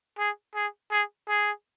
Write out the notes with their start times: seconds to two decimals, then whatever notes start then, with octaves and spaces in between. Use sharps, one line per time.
0.19 G#4
0.55 G#4
0.91 G#4
1.29 G#4